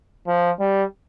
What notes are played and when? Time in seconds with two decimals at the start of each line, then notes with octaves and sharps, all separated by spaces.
0.28 F3
0.60 G3